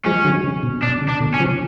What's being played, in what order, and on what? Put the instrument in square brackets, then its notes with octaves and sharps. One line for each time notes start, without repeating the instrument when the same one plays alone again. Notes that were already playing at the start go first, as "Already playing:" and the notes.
[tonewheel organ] F3 G#3 [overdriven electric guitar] C#4
[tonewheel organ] D3 F#3
C#3
B2
[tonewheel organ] B2 [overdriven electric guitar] D4
[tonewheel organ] C#3
[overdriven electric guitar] D4
[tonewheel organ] B2 D3
[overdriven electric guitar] C#4
[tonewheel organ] C#3 F3